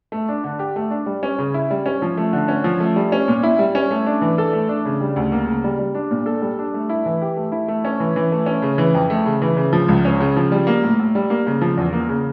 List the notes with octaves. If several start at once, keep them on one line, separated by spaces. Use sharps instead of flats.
A3
D4
D3
G4
A3
D4
G3
C#4
C#3
E4
G3
C#4
F3
A3
D3
C#4
F3
A3
G3
C#4
A#2
E4
G3
C#4
A3
D4
E3
A4
A3
D4
C#3
G3
D2
A#3
C#3
G3
G3
D4
A#2
A4
G3
D4
A3
E4
E3
G4
A3
E4
A3
C#4
E3
E3
A3
C#4
C#3
E3
F2
A3
C#3
E3
C#3
F3
C#2
C#4
C#3
F3
G3
A#3
A2
A2
G3
A#3
C#3
F3
E2
A#3
C#3